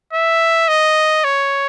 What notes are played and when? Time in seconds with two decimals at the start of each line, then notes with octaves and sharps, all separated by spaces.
0.13 E5
0.68 D#5
1.24 C#5